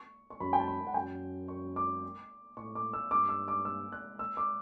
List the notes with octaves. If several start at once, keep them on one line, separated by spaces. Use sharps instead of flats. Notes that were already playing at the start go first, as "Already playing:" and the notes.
Already playing: C#6
C#6
F#2 B5
G5
A5
B5
F#5
F#2 G5
C#6
D6
A2 C#6
D6
E6
G2 D6
E6
D6
E6
F#6
E6
D6